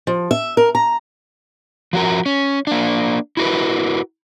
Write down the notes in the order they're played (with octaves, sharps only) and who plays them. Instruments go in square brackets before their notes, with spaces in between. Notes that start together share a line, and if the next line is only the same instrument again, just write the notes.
[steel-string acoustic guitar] F3
E5
A#4
A#5
[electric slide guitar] F3 F#4 A#4
C#4
A#3 D4
E4 F#4 A#4 B4